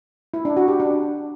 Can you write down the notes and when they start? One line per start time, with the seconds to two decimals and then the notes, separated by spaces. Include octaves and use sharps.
0.34 E4
0.45 D4
0.57 F#4
0.68 G4
0.80 D4